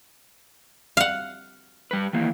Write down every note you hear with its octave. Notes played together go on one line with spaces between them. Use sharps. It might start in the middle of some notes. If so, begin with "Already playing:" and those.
F5 F#5
G3 B4
D#3 E3 A#3